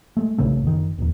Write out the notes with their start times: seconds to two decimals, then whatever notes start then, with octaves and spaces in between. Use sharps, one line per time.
0.17 G#3 A3
0.38 B1 A2 C#3 A3
0.63 F#1 D#3
0.98 D1 E2